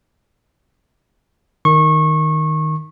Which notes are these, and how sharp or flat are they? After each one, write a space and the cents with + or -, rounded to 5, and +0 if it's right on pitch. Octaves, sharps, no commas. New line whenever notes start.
D#3 +0 C#6 -25